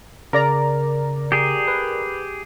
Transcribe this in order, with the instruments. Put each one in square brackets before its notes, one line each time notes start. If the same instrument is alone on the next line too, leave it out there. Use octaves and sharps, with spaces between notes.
[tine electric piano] C#3 [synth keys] A#4 D5 A#5
[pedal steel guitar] G4 G#4
[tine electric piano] B4